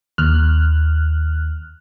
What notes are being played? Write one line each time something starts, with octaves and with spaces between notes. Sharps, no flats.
D#2 F6 F#6